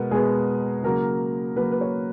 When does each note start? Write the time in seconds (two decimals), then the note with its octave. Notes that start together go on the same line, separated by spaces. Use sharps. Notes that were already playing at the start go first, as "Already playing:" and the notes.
Already playing: B2 G#3 B3 A#4
0.11 B2 G#3 B3 G#4
0.83 C#3 F#3 A#3 A#4
1.56 C#3 F#3 A#3 B4
1.72 B4
1.81 C#5